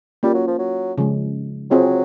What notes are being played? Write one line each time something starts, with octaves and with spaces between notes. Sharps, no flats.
G3 A#3 C#4 F4
F#3
F3
F#3
C#3 F3 G#3
F#3 C4 F4 G#4 C5